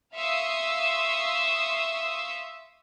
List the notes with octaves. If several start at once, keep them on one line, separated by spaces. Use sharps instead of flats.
E5 F5 C6 C#6 D#6 E6